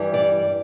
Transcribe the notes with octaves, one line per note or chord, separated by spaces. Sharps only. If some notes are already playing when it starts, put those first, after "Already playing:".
Already playing: G2 E3 G3
D5